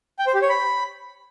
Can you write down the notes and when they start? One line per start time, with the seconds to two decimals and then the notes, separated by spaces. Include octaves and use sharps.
0.19 G5
0.27 C5
0.34 G4
0.42 C#5
0.50 B5